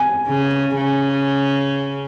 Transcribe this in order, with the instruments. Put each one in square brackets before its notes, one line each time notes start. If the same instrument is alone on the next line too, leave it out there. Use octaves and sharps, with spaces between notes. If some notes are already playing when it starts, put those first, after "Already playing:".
Already playing: [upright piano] G#5
[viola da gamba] C#3
C#3